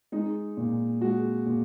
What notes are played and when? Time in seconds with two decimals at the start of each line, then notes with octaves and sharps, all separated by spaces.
0.12 G#3 D#4
0.57 A#2
1.01 G#3 F#4
1.46 A#2